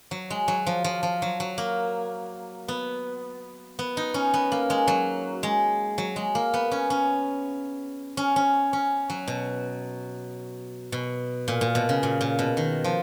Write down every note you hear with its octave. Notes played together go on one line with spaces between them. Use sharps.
F#3
G#3
F#3
F3
F3
F3
F#3
F#3
A#3
B3
B3
D#4
C#4
B3
A#3
G#3
F#3
G#3
F#3
G#3
A#3
B3
C#4
C#4
C#4
C#4
C#4
F#3
B2
B2
A#2
A#2
B2
C#3
A#2
A#2
B2
D#3
F3